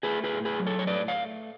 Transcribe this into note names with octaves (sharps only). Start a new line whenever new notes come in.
A3 G#4 B4
G#4 B4
A2
G#4 B4
F#3
A4 C#5
C#5
A2 B4 D5
C#5 F5
A3